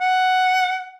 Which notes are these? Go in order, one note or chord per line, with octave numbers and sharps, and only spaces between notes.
F#5